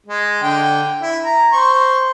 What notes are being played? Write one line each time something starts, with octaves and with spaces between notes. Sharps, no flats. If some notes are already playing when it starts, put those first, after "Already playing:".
G#3
D3 G5
E4
A#5
C5 C#6